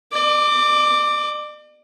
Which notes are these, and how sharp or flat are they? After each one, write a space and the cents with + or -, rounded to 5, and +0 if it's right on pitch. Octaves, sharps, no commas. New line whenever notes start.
D5 +45 D6 +0